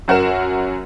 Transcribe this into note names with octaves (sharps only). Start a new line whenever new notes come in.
F#2 F#4 A#4 E7